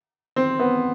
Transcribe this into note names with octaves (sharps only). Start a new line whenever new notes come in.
C4
B3